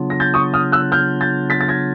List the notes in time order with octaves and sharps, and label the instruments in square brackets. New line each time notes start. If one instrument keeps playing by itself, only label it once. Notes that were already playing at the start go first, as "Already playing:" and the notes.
Already playing: [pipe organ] C#3 F#3 B3 D4 F4
[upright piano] A#6
G6 A6
C#6 D#6
D#6 F6
E6 F#6
F6 G6
G6 A6
A6 B6
A6
G#6 A#6